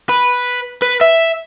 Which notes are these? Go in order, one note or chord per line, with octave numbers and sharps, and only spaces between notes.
B4
B4
E5